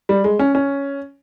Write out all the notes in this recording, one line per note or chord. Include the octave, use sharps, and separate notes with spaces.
G3
G#3
C#4
C#4